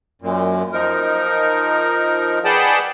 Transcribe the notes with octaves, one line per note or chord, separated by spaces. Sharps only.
F#2 A#2
F3 D#4 A#4
G#4 B4 D5 F#5 G5 A5